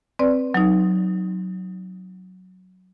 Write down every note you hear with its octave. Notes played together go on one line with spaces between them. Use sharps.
C4 B4 D5
F#3 D#4